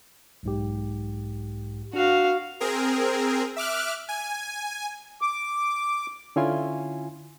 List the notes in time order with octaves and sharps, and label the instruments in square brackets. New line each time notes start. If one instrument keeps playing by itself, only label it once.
[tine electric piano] B1 G#2 G4
[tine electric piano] D4 [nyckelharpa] F#4 F5
[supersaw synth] C4 G#4 A#4
E5 D6 F6 F#6
G#5
[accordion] D6
[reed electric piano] D3 C#4 E4 F4 G#5 C6